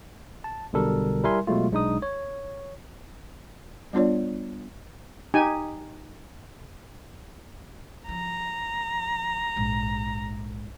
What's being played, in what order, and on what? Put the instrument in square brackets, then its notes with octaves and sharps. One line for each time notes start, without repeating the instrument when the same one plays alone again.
[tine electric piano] A5
B1 B2 D3 G3 A4 A#4
G3 E4 A#4 E5 G#5 C6
B2 F#3 G#3 A3 F4
B1 G#3 D4 D#4 D#6
C#5
[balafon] G3 B3 D4 F4 C#5 D5
[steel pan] D#4 G4 G#5
[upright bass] F3 [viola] A#5
[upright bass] A#1 G#2